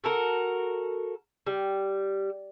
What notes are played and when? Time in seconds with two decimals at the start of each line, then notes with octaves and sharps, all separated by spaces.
0.04 F#4 A4 A#4
1.47 G3